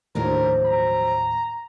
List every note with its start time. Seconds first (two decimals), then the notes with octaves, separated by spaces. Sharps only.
0.15 D#2 A2 F3 F#3 D4 A#4
0.65 A#5